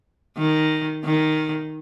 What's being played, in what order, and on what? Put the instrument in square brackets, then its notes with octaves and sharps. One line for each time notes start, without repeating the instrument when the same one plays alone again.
[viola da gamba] D#3
D#3